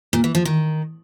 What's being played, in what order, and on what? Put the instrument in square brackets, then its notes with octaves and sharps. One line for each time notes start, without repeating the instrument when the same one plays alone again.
[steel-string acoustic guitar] A#2
E3
F3
D#3